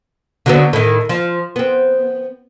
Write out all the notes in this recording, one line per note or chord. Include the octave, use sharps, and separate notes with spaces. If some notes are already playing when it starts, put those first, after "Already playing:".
D3 F#3 B3
A2 D#3
F3
B3 C4